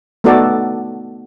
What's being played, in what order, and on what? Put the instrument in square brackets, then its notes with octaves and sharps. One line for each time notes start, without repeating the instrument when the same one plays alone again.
[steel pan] A3 B3 D#4 F#4 A4 D5